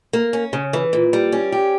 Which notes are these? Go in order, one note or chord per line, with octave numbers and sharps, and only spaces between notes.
A#3
C#4
C#3
E3
A#2
G3
C#4
G4